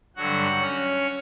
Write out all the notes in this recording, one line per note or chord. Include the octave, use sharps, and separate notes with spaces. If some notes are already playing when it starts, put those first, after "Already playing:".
G2 D3 F#3 F#4 F#5
C#4 C#5